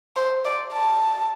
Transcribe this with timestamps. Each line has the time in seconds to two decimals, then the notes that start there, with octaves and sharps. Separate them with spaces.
0.16 C5
0.45 D5
0.73 A5